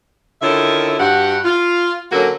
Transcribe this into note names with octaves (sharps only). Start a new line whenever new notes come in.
D3 D#3 C#4 E4 F4 E5
G2 F#4 G4 F#5
F4
D3 F#3 A3 A#3 C#4 F#4